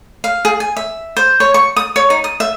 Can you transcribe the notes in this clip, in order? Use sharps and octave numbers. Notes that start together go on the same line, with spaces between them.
F5
G#4
G#5
E5
C5
C#5
C#6
D#6
C#5
D#4
D#6
E5